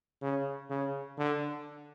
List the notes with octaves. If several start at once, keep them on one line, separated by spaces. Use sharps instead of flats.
C#3
C#3
D3